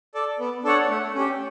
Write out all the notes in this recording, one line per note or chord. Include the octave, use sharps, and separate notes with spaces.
A4 D5
B3
D4 A4 C#5 F#5
A3
C#4 G4